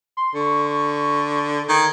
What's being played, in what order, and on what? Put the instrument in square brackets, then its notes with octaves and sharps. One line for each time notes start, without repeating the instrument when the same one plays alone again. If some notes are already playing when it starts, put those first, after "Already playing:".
[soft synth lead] C6
[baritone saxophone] D3 [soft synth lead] C#6
[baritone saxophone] D#3 [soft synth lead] G#6